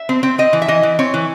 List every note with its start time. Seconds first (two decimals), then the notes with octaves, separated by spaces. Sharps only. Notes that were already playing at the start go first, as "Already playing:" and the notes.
Already playing: E5
0.09 C4
0.23 C4
0.38 C4 D#5
0.53 E3
0.62 E5
0.68 E3 D#5
0.83 E3
0.99 C4 C#5
1.14 E3